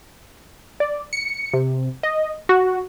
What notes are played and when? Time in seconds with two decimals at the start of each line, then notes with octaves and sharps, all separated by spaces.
0.80 D5
1.13 C#7
1.53 C3
2.03 D#5
2.49 F#4